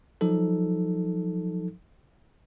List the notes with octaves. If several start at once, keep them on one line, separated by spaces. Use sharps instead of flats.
F3 F#3 D#4 A4